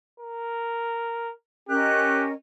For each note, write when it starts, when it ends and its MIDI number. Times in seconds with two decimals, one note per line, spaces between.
0.20 1.32 70
1.69 2.32 61
1.69 2.28 67
1.69 2.32 70
1.69 2.32 75
1.69 2.22 90